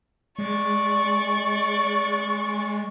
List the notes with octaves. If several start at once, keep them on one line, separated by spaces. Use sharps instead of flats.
G#3 D5 C#6